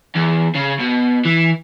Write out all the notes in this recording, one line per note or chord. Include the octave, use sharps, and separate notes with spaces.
E2
C#3
B2
E3